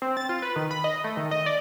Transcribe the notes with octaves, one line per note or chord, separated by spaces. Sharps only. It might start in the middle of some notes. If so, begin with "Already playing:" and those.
C4
A6
F4
B4
D#3
B5
D#5
A3
D#3
D#5
D5